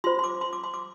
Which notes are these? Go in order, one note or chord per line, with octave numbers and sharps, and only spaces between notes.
F4 C5 C6
C6
D6
C6
D6
C6
D6